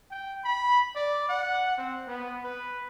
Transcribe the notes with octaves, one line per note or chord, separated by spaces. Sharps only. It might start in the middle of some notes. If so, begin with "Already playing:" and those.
G5
B5
D5
F#5
C4
B3
B4